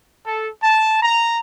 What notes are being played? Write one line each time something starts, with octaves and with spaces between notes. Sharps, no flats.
A4
A5
A#5